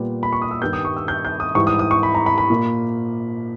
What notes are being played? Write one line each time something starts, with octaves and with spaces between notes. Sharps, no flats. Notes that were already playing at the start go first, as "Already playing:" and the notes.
Already playing: A#2 G3 B3
B5
C#6
D#6
E6
G2 D#3 G3 B3 G6
D#6
C#6
E6
G6
G6
D#6
G#2 E3 G3 C#6
D#6
D#6
C#6
B5
A#5
B5
B5
A#2 A#3